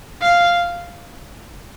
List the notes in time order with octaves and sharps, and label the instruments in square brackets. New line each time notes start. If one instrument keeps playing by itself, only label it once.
[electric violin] F5